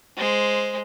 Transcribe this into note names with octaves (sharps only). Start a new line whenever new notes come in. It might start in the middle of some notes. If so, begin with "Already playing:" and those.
G#3 C5